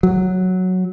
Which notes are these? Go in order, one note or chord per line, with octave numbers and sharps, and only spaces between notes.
F#3